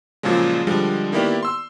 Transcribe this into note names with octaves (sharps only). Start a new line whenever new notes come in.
A#2 C#3 F3 F#3 G#3
D3 F3 G3 G#3
D#3 A#3 B3 E4 G4 D5
C6 E6